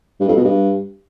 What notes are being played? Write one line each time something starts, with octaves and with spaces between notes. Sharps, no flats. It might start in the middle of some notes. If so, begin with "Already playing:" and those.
G2
F2
B2
G2